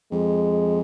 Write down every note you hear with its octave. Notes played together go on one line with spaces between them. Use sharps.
F2 G#3